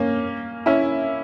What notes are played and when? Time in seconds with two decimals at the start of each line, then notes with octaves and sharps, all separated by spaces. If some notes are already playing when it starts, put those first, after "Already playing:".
Already playing: A#3 C#4
0.66 C#4 E4